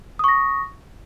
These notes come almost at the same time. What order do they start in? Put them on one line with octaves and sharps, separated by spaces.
D#6 C#6 A#6